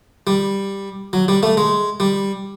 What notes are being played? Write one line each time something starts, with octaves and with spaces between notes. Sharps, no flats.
G3
F#3
G3
A3
G#3
G3